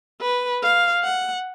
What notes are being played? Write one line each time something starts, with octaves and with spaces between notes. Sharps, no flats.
B4
F5
F#5